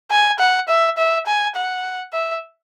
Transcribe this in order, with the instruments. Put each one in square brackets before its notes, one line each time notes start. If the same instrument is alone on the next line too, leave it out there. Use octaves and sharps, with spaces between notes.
[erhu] G#5
F#5
E5
E5
G#5
F#5
E5